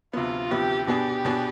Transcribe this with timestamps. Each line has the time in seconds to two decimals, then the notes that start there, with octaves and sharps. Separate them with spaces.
0.13 D2 C3 F3 B3 F4
0.51 D2 C3 F3 B3 G4
0.87 B2 B3 D4 G4 G#4
1.25 B2 B3 D4 G#4